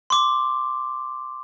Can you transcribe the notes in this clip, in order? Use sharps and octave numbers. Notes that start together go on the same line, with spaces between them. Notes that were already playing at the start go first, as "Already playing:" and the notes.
C6 D6